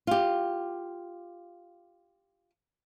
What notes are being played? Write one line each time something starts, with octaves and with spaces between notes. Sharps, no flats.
F4 G4